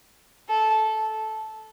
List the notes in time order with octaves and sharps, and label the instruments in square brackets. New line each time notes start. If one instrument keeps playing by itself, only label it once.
[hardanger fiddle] A4